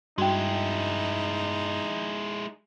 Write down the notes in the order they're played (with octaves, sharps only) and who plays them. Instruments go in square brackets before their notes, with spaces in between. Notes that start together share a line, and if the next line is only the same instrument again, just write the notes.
[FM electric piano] G2 [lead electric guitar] G#3 E4 [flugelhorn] D#4 [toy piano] F#4 G5